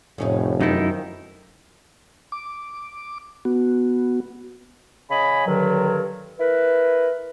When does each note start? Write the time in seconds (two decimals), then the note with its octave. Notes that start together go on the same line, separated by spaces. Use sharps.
0.18 F1 A2 C#4 D#4
0.61 F#2 D#3 F3 D#4 E4
2.32 D6
3.45 B3 F#4
5.10 C#3 D#5 G#5 B5
5.47 G2 D3 D#3 F#3
6.39 E4 A#4 B4